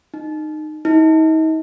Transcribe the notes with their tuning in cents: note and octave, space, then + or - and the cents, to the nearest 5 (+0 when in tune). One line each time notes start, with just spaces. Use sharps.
D#4 -20
D#4 +35